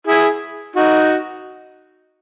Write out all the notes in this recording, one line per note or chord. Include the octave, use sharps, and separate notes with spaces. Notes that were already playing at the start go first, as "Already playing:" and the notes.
E4 G#4
D#4 F#4